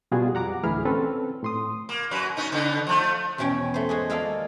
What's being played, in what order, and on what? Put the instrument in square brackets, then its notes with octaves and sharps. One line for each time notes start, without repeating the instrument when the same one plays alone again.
[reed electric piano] B2 G3 F4 F#4 G#4
F2 G3 F#5 A#5 D6
D2 A2 E3 G#4 B5 F6
C4 C#4 A4 B4
A2 C6 D#6
[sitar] A#3
F#2 F#3 B4
B3 C#4 D#4
C#3 B3 D#4
F3 A3
[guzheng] E2 B2 C#4 C#5 G5
A3 C5
G#3 F#4 G#4
G#3 A#3 F4 A4 D5 F5